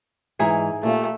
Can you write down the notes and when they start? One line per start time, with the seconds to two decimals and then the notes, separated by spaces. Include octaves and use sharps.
0.39 G#2 E3 D#4 E4 G#4 A#5
0.83 A#2 A3 G4 F5